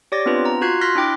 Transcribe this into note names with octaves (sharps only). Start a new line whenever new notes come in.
G4 C#5 D5 D6 A#6
B3 C4 D4 F4 B4
A#5
F4 F#4 F#6 G#6 C7
C6 F6 F#6 A#6 B6
D4 E4 G5 D6